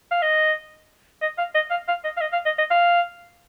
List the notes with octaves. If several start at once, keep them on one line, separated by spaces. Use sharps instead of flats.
F5
D#5
D#5
F5
D#5
F5
F5
D#5
F5
D#5
F5
D#5
D#5
F5